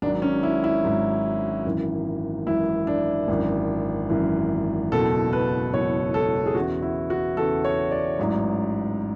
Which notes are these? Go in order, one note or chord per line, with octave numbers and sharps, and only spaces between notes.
G#1 G#2 F#3 D4
C#4
E4
E4
G#1 G#2 F#3
G#1 F#2 E3
G#1 F#2 E3 E4
D4
G#1 F#2 E3
G#1 F#2 E3
F#1 E2 B2 A4
B4
F#1 E2 B2 C#5
A4
G#4
E2 C#3 E3 F#4
E4
F#4
E2 C#3 E3 A4
C#5
D5
A1 G#2 F#3